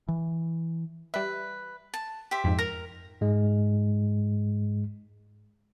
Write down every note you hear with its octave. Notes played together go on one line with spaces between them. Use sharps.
E3
G3 B4 E5
A5
G4 C5 E5
F2 G#2
A#4 A#6
G#2 G#3